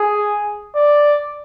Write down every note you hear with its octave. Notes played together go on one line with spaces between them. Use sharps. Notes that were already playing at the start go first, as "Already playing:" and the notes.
Already playing: G#4
D5